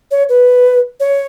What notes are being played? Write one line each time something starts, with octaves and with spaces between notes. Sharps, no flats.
C#5
B4
C#5